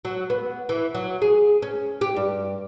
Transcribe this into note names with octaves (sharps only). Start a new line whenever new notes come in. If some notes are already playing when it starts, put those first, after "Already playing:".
F#3
B3
E3
F#3
G#4
C#4
G4
G2